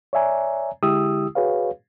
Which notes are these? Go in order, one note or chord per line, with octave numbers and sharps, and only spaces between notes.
C#5 D5 E5 G#5 A#5
D3 G#3 E4 G4 D#6 E6
F#4 G#4 B4 C#5 F5